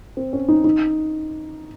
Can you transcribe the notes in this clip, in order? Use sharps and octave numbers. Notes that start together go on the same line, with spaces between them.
C4
C#4
D#4
D#4